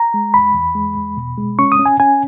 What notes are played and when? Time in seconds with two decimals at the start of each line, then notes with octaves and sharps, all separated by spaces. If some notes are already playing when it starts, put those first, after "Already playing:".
Already playing: A#5
0.14 G#3
0.34 E2 B5
0.54 E2
0.75 G#3
0.96 E2
1.17 B2
1.37 G#3
1.59 C#4 C#6
1.72 D#6
1.79 C#4
1.86 G#5
2.00 C#4 G#5